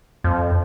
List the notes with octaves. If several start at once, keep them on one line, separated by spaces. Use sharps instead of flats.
F2